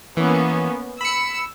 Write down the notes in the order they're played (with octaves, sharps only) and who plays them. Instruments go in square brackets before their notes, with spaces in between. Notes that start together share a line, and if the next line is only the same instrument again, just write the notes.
[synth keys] E3 [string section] A#3 B3 C#4
[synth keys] B5 C#7 [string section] E6